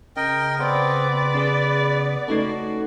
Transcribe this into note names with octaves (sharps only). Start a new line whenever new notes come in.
C#3 A#4 D#5 G5
B3 C4 B4 D5
B3 C#4 G#4
A3 C#4 D#4 F#4 A4